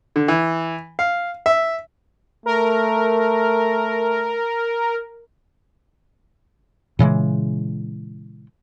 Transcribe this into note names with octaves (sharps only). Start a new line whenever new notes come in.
D3
E3
F5
E5
A3 A#4
A#2 C#3 E3 G#3